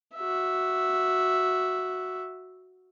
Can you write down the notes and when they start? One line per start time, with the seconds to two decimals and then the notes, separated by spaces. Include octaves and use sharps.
0.16 F#4 E5